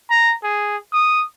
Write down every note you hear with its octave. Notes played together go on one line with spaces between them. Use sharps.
A#5
G#4
D#6